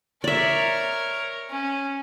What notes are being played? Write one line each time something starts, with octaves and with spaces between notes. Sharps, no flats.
A#4 C#5 D5 E5
C#4